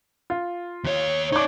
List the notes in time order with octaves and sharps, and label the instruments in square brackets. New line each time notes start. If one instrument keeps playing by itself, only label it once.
[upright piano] F4
[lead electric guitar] D#2 C#5
[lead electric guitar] D#4 D5 [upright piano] C#5 D6